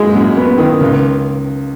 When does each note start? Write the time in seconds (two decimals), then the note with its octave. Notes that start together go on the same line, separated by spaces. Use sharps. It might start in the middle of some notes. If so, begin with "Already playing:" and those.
Already playing: F#2 G#3
0.15 F#2
0.37 B3
0.58 D#3
0.80 C#2